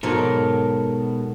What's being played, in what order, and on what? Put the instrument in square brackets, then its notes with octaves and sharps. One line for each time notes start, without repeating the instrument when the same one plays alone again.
[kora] G#2 F#3 C#5 [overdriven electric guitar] B2 [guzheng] A4 A#4